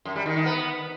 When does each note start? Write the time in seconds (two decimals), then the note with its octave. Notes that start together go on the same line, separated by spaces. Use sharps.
0.05 F#2
0.16 G3
0.26 D#3
0.36 D#3
0.46 B3